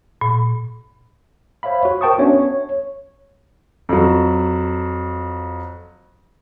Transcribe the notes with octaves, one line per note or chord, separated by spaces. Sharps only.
A#2
C5 C#5 E5 F5 B5
F#4
A#4 C5 G5 A5 C#6 D#6
B3 C#4 D4 F#4 C#5 E5
C#5
F2 F#3